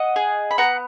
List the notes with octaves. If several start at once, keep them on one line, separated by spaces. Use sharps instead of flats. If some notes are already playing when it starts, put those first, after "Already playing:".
Already playing: D#5 F#5
G#4
B5
B3 F#5 A#5